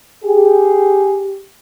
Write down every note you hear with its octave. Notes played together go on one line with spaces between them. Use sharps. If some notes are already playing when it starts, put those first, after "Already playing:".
G4 G#4